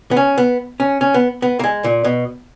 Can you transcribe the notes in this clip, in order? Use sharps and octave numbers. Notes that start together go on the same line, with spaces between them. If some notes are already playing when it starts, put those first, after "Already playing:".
B3
C#4
B3
C#4
C#4
B3
B3
A#3
G#3
A#2
B2